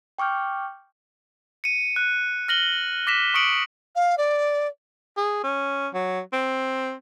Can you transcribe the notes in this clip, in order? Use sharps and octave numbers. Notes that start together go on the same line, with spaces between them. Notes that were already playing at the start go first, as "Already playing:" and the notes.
G5 C#6 D6 F6 G6
C#7 D#7
F#6
F6 A#6 F#7 G7
D6 A#6 B6 E7
C#6 D#6 C#7 D7 F#7
F5
D5
G#4
C#4
F#3
C4